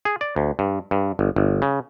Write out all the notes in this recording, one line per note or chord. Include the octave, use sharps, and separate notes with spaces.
G#4
D5
D2
G2
G2
G1
G1
C#3